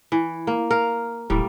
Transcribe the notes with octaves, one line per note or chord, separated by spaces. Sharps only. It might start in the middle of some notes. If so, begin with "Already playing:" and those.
E3
A#3
A#4 F5
D1 A2 G3 A#3